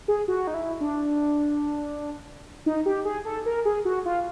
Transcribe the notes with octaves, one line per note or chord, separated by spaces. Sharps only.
G#4
F#4
D#4
E4
D4
D#4
G4
G#4
A4
A#4
G#4
F#4
F4